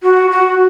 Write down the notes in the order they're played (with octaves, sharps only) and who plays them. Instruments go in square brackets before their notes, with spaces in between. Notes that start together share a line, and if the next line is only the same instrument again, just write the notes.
[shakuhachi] F#4
F#4